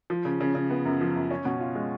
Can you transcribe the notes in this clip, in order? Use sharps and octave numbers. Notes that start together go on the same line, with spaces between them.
F3
C#3
C#3
C#3
B3
F#2
F3
F#2
C#4
B2
F4
G#3